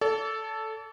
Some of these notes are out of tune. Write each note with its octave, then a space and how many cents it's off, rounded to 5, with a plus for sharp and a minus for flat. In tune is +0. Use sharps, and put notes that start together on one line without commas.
A4 +0 D5 -45